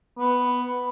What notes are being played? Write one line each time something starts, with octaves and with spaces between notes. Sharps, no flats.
B3